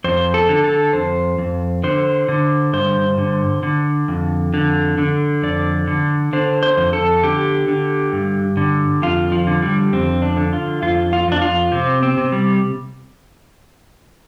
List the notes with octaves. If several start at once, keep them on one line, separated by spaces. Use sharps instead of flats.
F2 C5
A4
D3
A4
F2 C5
F2
D3 C5
D3
G2 C5
D3
D3
F2
D3
D3
F2 D5
D3
D3 C5
C5
F2
A4
D3 G4
D3
G2
D3
F2 F4
F3
D3
G3
F2 C4
D4
D3
F4
F2 F4
F4
F2 D4
F4
C3 C4
C4
C3
G3